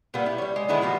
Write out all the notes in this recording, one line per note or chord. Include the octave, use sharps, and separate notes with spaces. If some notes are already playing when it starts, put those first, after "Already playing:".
A#2 G3 A#3 B3
E4 G4
G3 C#5
G#3
D3 D#3 G#3 B3 E4 G#5
A#2 F3 G3 F#4